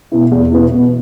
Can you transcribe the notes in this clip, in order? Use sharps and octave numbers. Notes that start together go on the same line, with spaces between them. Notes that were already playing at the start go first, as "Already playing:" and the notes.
B2 B3 E4
E2
B2 B3 E4
B2